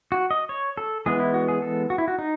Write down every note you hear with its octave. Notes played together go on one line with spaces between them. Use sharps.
F#4
D#5
C#5
A4
E3 G#3 B3 G#4
E4
F#4
G#4
A4
F#4
E4
F#4
D#4